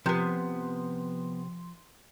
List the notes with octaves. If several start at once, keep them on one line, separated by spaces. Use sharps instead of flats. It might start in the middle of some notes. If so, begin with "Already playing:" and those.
C3 F3 B3 C4 C6